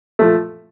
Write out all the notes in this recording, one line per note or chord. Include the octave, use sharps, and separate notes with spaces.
F3 A3